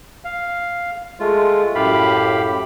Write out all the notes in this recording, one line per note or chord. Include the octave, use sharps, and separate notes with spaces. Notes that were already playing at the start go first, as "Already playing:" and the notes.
F5
G#3 A3 F4
F#2 A2 G4 F5 B5